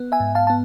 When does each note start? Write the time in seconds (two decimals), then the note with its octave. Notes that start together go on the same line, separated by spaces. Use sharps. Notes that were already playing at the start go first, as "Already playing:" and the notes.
Already playing: B3
0.12 E5 G#5
0.20 G#2
0.35 F5 A5
0.47 B3 A5